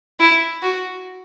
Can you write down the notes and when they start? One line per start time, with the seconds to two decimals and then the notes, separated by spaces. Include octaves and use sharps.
0.20 E4
0.62 F#4